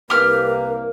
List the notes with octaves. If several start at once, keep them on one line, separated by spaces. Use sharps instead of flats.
C2 A#3 G4 A#4 B4 F6